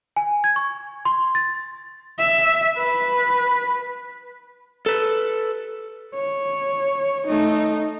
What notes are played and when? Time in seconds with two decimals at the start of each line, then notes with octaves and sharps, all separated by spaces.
0.16 G#5
0.44 G#6
0.56 C#6
1.05 C6
1.35 A6
2.19 E5
2.77 B4
4.86 A4 B4
6.15 C#5
7.28 A3 D#4